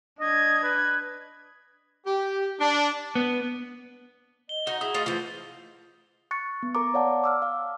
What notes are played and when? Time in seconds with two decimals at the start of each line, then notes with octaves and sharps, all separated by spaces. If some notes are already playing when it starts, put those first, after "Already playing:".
0.20 D4 D#5 G#6
0.63 B4
2.06 G4
2.60 D4
3.15 B3
4.49 D#5 G7
4.67 D#4 F#4
4.81 E4 G#4 D#6
4.94 A3 F4 D#5 F5
5.06 A2 E3 F3 F4
6.31 C#6 F#6 A6 C#7
6.63 B3
6.75 A#4 A#5 D6
6.94 C#5 D5 F5 F#5 A5
7.24 D6 E6 F6
7.42 F5